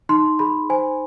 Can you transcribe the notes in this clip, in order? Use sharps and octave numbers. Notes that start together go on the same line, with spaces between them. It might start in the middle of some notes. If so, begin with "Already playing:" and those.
D#4 C6
G#4 B5
C5 G#5